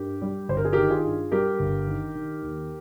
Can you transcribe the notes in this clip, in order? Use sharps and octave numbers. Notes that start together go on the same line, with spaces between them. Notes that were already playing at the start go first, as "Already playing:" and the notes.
Already playing: G2 G4 A#4
G3
G1 C5
A#4
G#4
D#3 G4 A#4
F4 G#4
G2
G3 G4 A#4
G1
D#3
D#3
D#2